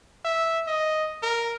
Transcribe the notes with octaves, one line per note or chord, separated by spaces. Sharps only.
E5
D#5
A#4